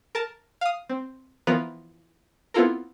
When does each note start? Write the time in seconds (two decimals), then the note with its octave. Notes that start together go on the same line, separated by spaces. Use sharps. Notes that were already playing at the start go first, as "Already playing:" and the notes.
0.15 A#4 A5
0.61 F5 D#6
0.90 C4
1.47 E3 F3 B3 F4 A#4 B4
2.54 B3 C4 E4 F4 A4 A#4